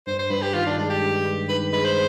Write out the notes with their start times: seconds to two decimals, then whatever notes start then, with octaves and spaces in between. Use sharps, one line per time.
0.07 G2 C5
0.19 C5
0.30 G2 B4
0.42 G4
0.54 D#3 F4
0.66 D4
0.78 G#3 D4
0.90 G4
1.02 G2
1.25 G2
1.49 D#3 B4
1.73 G#3 B4
1.84 C5